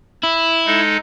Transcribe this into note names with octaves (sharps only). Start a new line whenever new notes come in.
E4
G#3 D#4 A4